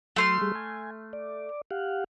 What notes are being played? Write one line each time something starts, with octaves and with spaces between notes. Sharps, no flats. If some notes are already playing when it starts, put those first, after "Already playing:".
F#3 A3 C6 F6
G3 G#4
G#5
D5
G4 F5 F#5